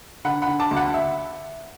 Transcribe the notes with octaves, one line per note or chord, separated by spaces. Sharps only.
D3 F#5 B5
F#5 B5
D3
A5 D6
D2
F#5 B5
E5